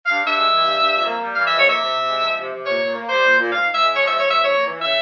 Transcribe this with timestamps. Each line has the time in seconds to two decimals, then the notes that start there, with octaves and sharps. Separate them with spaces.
0.06 G2 F5
0.21 G2
0.27 E5
0.36 G#3
0.49 E3
0.63 G2
0.79 G2
0.92 F2
1.06 A#3
1.21 G3
1.35 E3 F5
1.47 F2 E5
1.59 C#5
1.64 A#3
1.69 E5
1.79 C3
1.94 C3
2.08 G#3
2.22 F3
2.37 C3
2.51 C3
2.66 A#2 C#5
2.79 A#2
2.95 A#3
3.09 G3 C5
3.24 A#2
3.38 A#2
3.52 G#2 F5
3.66 G#2
3.73 E5
3.81 G#3
3.95 F3 C#5
4.07 G#2 E5
4.19 G#2 C#5
4.30 E5
4.39 F2 C#5
4.53 A#3
4.67 E3
4.81 C#3 E5